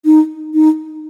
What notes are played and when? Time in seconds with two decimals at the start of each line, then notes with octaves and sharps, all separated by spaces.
0.05 D#4
0.54 D#4